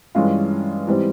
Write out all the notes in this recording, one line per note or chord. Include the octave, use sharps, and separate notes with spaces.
G2 E3 G#3 C#4 F4
G#2 E3 G3 C4